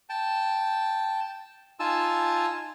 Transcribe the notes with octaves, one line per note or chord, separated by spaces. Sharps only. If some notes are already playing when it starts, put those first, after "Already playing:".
G5 A5
D#4 F4 G#5 A5 E6